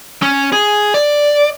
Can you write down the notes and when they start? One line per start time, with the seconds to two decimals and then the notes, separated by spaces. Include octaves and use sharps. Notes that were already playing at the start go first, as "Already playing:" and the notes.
0.22 C#4
0.52 G#4
0.94 D5